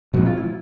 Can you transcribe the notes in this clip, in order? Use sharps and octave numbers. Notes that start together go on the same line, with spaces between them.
A#2 F3 G#3 C4 F#4
F4
E4